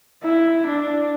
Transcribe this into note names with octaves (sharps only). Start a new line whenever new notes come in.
E4
D4